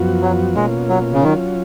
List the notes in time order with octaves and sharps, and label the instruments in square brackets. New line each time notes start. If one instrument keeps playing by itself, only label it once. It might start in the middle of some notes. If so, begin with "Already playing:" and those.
Already playing: [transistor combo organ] F#2 F3 B3 F#4
[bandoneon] F#3
[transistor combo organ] B2 A#3 C#4 F4 [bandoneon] G#3
[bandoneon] F#3
C#3
[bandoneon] D#3 [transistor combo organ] F#3 C#4 F4